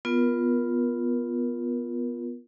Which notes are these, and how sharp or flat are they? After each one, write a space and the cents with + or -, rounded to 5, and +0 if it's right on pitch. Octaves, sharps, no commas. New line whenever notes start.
B3 +0 F4 +0 A#4 +25